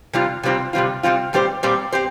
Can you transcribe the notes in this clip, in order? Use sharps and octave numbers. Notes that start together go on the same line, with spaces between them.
C3 G3 C4 F4
C3 G3 C4 F4
C3 G3 C4 F4
C3 G3 C4 F4
A#2 G3 C4 G4 C5
A#2 G3 C4 G4 C5
C4 G4 C5